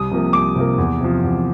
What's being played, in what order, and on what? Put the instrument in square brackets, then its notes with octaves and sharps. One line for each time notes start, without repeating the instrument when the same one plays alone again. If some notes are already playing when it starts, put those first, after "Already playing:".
Already playing: [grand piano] C2 D#6
C3 F3 A#3
C2 D6
C3 F3 A#3
E2
C3 F3
E2